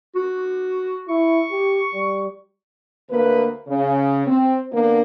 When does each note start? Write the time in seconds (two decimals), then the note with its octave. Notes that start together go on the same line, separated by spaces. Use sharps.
0.16 F#4
1.08 E4 C#6
1.51 G4
1.93 G3
3.10 D2 A#3 B4
3.68 C#3
4.27 C4
4.72 D3 A#3 B3 D4